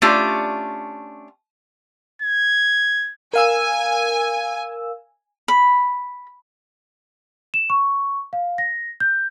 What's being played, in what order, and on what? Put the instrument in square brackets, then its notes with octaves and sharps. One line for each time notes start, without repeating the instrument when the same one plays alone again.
[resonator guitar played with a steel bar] A3 C#4 D4 F4 G4 D5
[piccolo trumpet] G#6
[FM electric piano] A#4 F5 E6 [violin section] G#5
[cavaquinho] B5
[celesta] E7
C#6
F5
A#6
G6